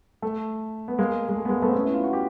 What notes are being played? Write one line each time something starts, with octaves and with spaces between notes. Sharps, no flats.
A3
B3
G#3 A#3
G#3
A3
B3
G#3 A#3
A3 B3
C4
B3 C#4
E4
F4
F#4
F4 G4